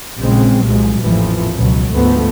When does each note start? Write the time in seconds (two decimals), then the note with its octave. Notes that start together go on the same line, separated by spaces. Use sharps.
0.18 A#1 C#3 G#3 C4
0.62 C2 A#2 F3 F#3 G#3
1.00 A1 F2 A#2 E3 F3
1.57 C#2 B2 F#3
1.92 D2 G#2 F3 A3 B3